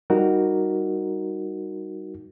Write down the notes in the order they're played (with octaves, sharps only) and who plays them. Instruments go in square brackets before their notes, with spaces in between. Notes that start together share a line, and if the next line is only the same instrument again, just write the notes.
[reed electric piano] G3 D#4 F#4 A#4